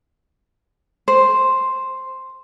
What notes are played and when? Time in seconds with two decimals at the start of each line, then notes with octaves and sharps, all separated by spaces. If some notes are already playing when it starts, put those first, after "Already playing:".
1.08 C5